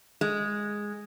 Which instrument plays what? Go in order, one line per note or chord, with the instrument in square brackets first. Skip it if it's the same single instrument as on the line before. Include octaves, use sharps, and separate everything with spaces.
[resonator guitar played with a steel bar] G#3